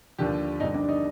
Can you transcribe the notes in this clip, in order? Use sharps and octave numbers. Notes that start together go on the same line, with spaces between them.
D#2 D3 F3 G4
G1 F2 D3 G3 D#4 D#5
D4 D5
D#4 D#5